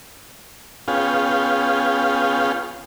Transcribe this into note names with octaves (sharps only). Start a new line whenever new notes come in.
B3 C#4 F4 G#4 F5 G5